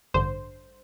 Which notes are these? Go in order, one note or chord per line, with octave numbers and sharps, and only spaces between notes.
A1 G2 D3 C5